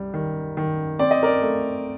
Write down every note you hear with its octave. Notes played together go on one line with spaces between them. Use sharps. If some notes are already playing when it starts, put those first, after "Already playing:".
Already playing: C2 G3
D#3
D#3
C4 D5
D#5
A#4 D5
A3